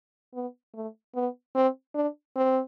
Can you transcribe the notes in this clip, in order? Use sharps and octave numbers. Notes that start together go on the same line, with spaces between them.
B3
A3
B3
C4
D4
C4